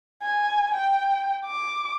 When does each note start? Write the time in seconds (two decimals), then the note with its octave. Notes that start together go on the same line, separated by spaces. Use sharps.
0.23 G#5
0.74 G5
1.46 D6